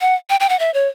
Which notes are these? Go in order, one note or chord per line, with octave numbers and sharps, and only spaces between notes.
F#5
G5
G5
F#5
E5
C#5